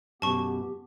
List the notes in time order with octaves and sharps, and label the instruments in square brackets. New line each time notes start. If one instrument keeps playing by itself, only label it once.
[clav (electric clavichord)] F#2 B2 [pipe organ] B3 G4 [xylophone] A5 C#6